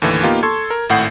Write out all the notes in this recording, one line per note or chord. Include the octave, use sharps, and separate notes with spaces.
D#2 A2 D3 E3
A#3 B3 D#4 F4 G4
A4 C6 C#6 G#6
A#4
G#1 A2 F#5 G6 C7